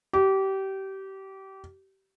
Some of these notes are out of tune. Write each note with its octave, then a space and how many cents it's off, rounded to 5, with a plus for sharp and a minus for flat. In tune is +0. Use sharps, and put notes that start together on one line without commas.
G4 -25